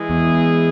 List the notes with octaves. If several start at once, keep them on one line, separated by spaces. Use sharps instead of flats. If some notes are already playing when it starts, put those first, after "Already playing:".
Already playing: E3 G#3 E4 G#4
E2